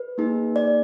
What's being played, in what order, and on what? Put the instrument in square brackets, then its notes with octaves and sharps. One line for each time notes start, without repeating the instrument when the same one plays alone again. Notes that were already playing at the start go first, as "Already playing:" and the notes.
Already playing: [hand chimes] B4
A#3 D#4 G#4
D5